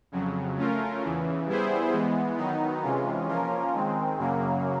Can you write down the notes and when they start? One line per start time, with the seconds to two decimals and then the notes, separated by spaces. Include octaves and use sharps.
0.12 F2 C#3 F#3
0.57 A3 C#4 F4 A#4
1.02 E2 C#3 E3
1.47 G3 B3 E4 G#4 C5
1.93 E3 G#3 B3
2.37 D#3 F#3 B3 D#4
2.83 C3 E3 G#3 C#4 F4
3.28 F3 A#3 C#4 F4 A#4
3.73 D#3 G#3 C4
4.18 F#2 C#3 F#3 A#3